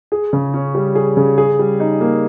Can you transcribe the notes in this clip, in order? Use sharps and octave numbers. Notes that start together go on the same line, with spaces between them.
G#4
C#3
C#4
G3
G#4
C#3
G#4
G3
D#4
A#3